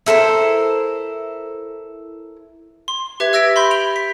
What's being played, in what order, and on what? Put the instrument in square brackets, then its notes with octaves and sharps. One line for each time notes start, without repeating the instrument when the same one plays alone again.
[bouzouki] E4 A4 A#4 C5
[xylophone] C6
G4 B4 E5 G#6
E5 E6 G#6 A#6 B6 D7
B5 C6 G6
D7 F7 G7
B6